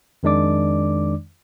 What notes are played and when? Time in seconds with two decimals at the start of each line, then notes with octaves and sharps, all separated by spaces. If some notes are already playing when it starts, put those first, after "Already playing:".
0.23 F2 D#3 G#3 D4 D5 D6